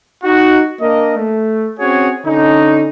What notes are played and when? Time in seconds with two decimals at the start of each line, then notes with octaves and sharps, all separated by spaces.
0.24 D#4 F#4
0.81 A#3 D4 A#4 D#5
1.16 A3
1.79 C4 C#4 F#4 G#4 C#5
2.26 D3 C#4 D#4